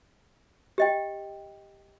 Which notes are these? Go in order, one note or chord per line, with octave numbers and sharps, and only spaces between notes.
G4 D#5 G5